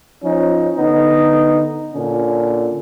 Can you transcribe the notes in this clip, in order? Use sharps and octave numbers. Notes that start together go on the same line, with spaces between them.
F3 C#4 D#4
D3 B3 D#4
A#2 D3 C#4